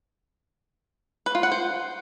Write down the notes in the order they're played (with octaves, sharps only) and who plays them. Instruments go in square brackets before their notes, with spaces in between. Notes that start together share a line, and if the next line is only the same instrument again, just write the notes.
[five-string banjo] B4
F4
F#5
C5